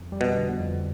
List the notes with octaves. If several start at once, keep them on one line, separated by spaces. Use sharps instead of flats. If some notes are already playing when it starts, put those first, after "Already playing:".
Already playing: F2
G3
B2
D3
F2